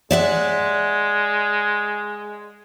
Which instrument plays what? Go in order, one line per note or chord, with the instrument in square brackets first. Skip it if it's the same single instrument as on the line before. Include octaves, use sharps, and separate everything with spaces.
[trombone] G#3 [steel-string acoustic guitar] D5 E5 F#5